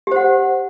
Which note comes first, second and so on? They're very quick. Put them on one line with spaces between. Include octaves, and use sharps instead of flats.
G4 C5 F#5